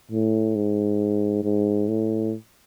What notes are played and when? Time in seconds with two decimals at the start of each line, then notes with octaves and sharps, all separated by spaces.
0.11 A2
0.55 G#2
1.43 G#2
1.88 A2